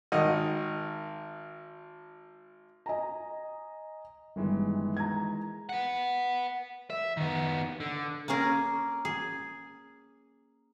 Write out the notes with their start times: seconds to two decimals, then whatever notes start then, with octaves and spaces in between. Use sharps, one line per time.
0.12 G#1 D#3 D#5 F#5
2.86 D#5 G#5 A#5
4.36 G1 D#3 E3 G#3
4.97 A#5 G#6
5.69 B4 F#5
6.90 E5
7.17 D#3 B3
7.80 D3
8.28 A#3 C#4 G#4 A#4
9.05 G#4